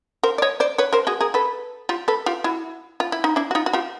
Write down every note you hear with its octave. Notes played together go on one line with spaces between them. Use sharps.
A#4 C5
D5
C#5 D#5
C5 D5
B4 C#5
A#4 C5
F#4 G#4
G#4 A#4
A4 B4
F4 G4
A4 B4
F4 G4
E4 F#4
F4
E4
D#4
D4 E4
F#4
D#4 F4
F#4
F4 G4